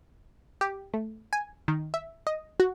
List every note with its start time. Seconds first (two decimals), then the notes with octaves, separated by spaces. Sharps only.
0.61 G4
0.94 A3
1.33 G#5
1.68 D#3
1.94 E5
2.27 D#5
2.60 F#4